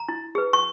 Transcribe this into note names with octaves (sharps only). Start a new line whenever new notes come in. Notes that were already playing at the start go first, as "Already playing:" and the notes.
Already playing: A#5
E4
G#4 B4
C#6